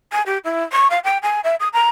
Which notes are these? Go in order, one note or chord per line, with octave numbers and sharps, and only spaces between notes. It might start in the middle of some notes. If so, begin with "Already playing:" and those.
G#5
G4
E4
C#6
F5
G5
G#5
E5
D#6
A#5